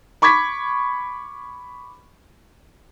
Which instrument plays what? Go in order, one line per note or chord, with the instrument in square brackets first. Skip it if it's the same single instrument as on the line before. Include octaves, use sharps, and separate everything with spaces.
[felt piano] B5 C#6 D6 G#6 B6